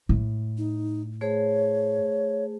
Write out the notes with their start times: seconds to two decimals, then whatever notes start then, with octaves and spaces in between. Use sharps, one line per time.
0.09 A2
0.57 D#4
1.21 A3 G#4 C5 C#5